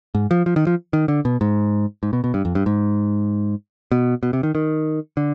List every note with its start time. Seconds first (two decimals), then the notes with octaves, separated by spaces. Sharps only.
0.15 G#2
0.31 F3
0.46 F3
0.56 D#3
0.67 F3
0.93 D#3
1.08 D3
1.25 B2
1.41 G#2
2.03 G#2
2.13 B2
2.24 B2
2.34 G2
2.45 F2
2.55 G2
2.66 G#2
3.92 B2
4.23 B2
4.33 C3
4.43 D#3
4.55 D#3
5.17 D3